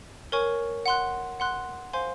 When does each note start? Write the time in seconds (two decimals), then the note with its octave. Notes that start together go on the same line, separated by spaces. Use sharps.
0.32 A#4 C#5 G#5 C#6
0.86 F#5 C6 F#6
1.40 F#5 C6 F#6
1.93 C5 F5 G#5 C6